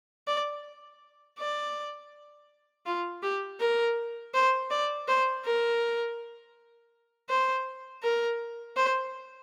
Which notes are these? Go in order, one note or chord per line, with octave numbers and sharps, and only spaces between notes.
D5
D5
F4
G4
A#4
C5
D5
C5
A#4
C5
A#4
C5